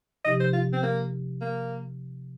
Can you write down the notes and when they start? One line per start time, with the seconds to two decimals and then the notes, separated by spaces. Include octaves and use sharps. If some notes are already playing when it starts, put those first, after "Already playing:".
0.25 C3 F3 D#4 G4 D#5
0.40 C5
0.53 F4
0.73 C4
0.83 A#3
1.41 A#3